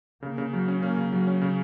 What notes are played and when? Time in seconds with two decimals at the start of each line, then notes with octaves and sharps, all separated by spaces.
0.22 C#3 A#3
0.38 C#3
0.53 F#3
0.68 C#4
0.82 A#3 C#4
0.97 C#3
1.12 F#3
1.27 C#4
1.42 C#3